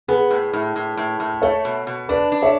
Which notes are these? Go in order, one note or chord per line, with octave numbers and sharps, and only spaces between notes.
B3 G#4 B4
A2
A2
A2
A2
A2
A3 A4 C#5
B2
B2
D4 B4 D5
D4
C#5 E5